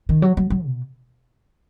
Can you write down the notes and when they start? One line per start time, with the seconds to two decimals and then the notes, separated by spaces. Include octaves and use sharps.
0.09 D#3
0.22 F#3
0.37 F#3
0.50 F#3
0.66 B2